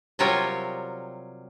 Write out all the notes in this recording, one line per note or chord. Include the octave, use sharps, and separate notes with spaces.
C3 F#3 G3 F4 A#4 C#5